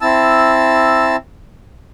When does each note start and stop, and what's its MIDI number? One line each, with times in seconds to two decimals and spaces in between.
0.01 1.16 60
0.01 1.16 64
0.01 1.16 81
0.01 1.16 88